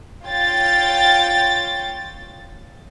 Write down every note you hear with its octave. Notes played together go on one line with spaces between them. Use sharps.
F4 C#5 G5 A6